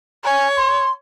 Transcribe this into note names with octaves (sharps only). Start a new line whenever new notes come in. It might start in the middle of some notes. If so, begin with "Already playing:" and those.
C#5 G#5
C6